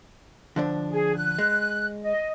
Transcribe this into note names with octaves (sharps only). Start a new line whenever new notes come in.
D3 F3 D4
G#4
F#6
G#3
D#5